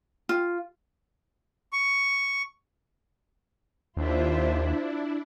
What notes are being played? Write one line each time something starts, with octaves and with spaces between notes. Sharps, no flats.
F4
C#6
D#2 D4 E4 F4 C5 E5